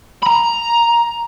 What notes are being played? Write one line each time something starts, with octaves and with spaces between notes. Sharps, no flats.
A#5 B5